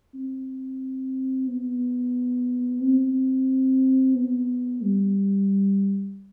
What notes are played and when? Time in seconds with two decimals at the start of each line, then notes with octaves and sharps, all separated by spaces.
0.14 C4
1.47 B3
2.81 C4
4.15 B3
4.82 G3